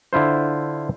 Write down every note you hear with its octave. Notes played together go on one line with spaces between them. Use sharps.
D3 E4 F4 C5